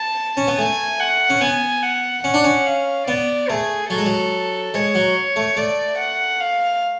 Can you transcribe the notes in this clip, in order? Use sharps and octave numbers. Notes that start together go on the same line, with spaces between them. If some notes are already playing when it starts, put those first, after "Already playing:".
Already playing: A5
C#4
B3
A3 G#5
F#5
C#4
B3 G#5
F#5
C#4 F#5
D4
C#4
F5
B3 D5
A3 G#4
F#3 A4
G#3
F#3
G#3 C#5
F#3
A3
A3 D5
F#5
F5